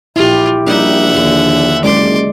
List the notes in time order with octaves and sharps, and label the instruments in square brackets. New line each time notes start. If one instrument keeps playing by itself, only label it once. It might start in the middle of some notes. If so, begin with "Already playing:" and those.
[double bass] A#1 [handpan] E4 G4 [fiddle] F4
[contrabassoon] A#1 [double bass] G3 D#4 [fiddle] E5 F#5
[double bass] D#2 D3
[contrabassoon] F#1 [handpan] G#3 D5 [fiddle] C6 D6